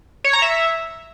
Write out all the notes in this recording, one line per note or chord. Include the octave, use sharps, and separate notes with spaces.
C#5
A#5
E5